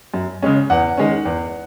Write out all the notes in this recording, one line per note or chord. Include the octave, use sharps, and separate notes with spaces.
F#2
C#3 G#3 C#4
E2 F#5
D#3 G#3 C#4
E2